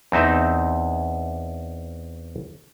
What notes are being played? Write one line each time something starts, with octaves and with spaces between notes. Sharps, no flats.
E2 C4 D#4 E5